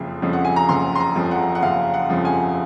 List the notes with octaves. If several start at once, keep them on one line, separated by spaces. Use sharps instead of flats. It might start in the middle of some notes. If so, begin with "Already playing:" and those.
Already playing: F#1 F2 C#3 F3
F2 C#3 F3
F#5
G#5
A#5
F#1 C6
C6
A#5
F2 C#3 F3
F#5
F#5
F#1 F5
F#5
F2 C#3 F3
G#5